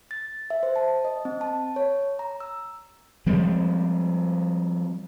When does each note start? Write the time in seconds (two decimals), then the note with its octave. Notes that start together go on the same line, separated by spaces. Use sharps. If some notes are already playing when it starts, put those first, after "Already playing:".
0.11 A6
0.50 E5
0.63 C5
0.76 A5
1.05 D#5
1.25 C4
1.41 A5
1.76 C#5
2.19 A#5
2.40 E6
3.26 F3 G3 G#3 C4